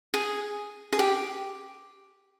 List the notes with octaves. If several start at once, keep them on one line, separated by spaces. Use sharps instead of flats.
G#4
G#4
G4